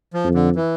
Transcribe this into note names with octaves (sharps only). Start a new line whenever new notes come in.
F3
F2
D3
E3